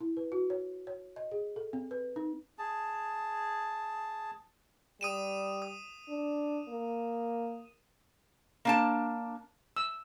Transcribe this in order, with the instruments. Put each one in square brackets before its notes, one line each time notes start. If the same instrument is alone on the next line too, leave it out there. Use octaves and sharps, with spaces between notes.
[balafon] E4
B4
F#4
C#5
C#5
D#5
G#4
A4
C4
B4
D#4
[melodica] G#4 A5
[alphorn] G3 [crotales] D#6 D#7 E7
[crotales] D#6
[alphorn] D4
A#3
[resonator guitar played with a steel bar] A#3 D4 A5
[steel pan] E6